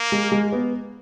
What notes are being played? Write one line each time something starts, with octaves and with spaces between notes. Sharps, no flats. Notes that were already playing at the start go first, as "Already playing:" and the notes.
Already playing: A#3
G#3
G#3
B3